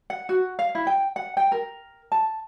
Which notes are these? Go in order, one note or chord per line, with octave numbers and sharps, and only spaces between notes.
F#5
F#4
F5
E4
G5
F#5
G5
A#4
A5